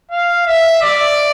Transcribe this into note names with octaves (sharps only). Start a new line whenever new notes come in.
F5
E5
D5